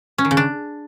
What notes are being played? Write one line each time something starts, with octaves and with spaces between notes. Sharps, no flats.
C#4
D#3
C#3
D4